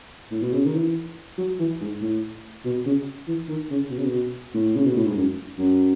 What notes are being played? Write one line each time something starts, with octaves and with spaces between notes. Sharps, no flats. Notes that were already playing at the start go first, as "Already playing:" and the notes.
A2
B2
C#3
D#3
E3
F#3
E3
G#2
A2
B2
C#3
E3
D#3
C#3
B2
C#3
B2
A2
C#3
B2
A2
G#2
F#2
F#2